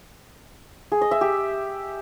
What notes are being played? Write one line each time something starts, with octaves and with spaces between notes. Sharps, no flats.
G#4
D#5
E5
G4